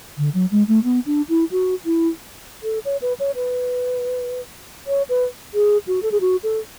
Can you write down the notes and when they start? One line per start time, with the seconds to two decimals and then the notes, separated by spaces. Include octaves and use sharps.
0.18 D3
0.34 F#3
0.51 G#3
0.68 A3
0.84 B3
1.06 D4
1.29 E4
1.51 F#4
1.85 E4
2.63 A4
2.85 C#5
3.02 B4
3.20 C#5
3.35 B4
4.87 C#5
5.09 B4
5.54 G#4
5.87 F#4
6.03 A4
6.12 G#4
6.21 F#4
6.43 A4